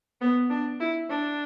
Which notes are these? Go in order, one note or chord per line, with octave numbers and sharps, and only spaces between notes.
B3
D4
E4
D4